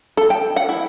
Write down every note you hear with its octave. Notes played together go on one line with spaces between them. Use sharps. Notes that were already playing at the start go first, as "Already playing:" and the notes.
A4
G5
F#5
E4